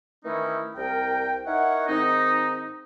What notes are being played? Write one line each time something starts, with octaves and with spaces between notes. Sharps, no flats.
D#3 E3 A3 C#4 D#4 E4
C2 A#4 G5
D#4 E4 A#4 C#5 F#5
G#2 D#3 C4 D#4